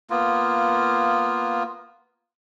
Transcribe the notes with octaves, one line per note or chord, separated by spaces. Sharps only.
A#3 B3 F4